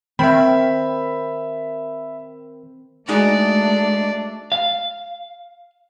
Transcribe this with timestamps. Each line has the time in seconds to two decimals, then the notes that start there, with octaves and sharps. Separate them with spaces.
0.19 D#3 C4 E5 B5
3.08 G#3 A3 D4 D#4 F#4 G#4 D5
4.52 F5